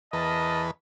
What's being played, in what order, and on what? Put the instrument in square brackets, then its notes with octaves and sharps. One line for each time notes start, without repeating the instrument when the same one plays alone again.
[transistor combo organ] E2 B4 [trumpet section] A#4 D#5 A5